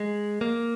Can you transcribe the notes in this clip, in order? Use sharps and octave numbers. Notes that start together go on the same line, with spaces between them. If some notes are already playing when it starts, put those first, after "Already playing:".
Already playing: G#3
A#3